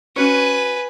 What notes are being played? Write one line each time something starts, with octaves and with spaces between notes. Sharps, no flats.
C#4 F#4 B4 C#5 G#5